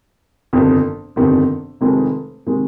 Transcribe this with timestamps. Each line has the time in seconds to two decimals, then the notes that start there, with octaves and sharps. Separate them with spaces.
0.53 G1 F2 C3 D#3
1.16 G1 F2 C3 D#3
1.81 F1 F2 C3 D#3 G#3
2.47 C3 D#3 G#3